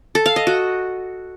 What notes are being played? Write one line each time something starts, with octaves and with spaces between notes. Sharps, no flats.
A4
F5
D#5
F#4